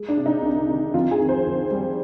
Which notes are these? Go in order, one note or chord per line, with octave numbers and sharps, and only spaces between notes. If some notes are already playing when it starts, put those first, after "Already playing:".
Already playing: G#3
D4
C3
D#4
C2
D#3
F2 F4
G#4
D#3
C5
F2
G3